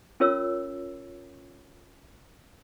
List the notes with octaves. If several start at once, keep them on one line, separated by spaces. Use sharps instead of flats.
C#4 F4 A#4 C#5 E6